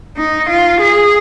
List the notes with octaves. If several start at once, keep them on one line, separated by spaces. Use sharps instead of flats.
D#4
F4
G#4